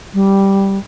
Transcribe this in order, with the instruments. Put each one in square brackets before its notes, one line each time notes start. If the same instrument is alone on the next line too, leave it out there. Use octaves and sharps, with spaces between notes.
[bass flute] G3